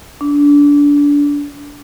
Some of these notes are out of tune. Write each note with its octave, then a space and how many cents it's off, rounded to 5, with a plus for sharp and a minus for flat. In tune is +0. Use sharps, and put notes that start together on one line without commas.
D4 -25